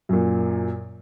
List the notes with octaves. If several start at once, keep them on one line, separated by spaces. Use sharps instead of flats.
F#2 A#2